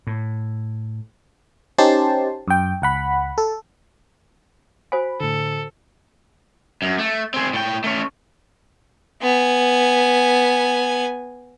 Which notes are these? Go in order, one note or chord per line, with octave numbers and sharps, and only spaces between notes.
A2
C#4 D#4 G4 C5 A5 C6
F#2 G5
C#2 F#5 B5
A4
F#4 C5 G#5 B5
A2 D3 A4
F#2
A3
C4 G#4
A2 G5
A3 C#4
B3 G#5